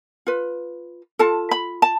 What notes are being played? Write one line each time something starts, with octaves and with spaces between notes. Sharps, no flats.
F4 B4
F4 A4 A5
B5
A5